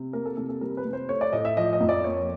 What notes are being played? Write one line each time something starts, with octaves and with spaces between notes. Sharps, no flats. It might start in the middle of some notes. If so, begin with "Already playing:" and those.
Already playing: C3
A#3 A#4
A4
C3 A4
A4
G3 A#4
B4
C3
C5
A3 C#5
D5
A2 D#5
E5
F3 D#5
D#5
F2
D5
A#3 C#5